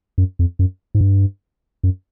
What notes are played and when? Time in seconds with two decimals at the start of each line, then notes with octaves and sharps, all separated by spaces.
0.18 F#2
0.39 F2
0.59 F#2
0.95 G#2
1.01 G2
1.83 F#2